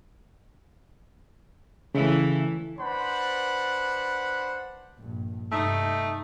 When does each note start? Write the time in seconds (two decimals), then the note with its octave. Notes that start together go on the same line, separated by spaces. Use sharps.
1.95 C#3 E3 A3 E4
2.79 D4 B4 C5 F#5 B5
4.98 A#1 G2
5.52 G2 C3 A3 D#4